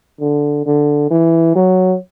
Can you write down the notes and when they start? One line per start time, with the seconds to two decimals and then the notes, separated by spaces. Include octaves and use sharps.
0.21 D3
0.66 D3
1.11 E3
1.55 F#3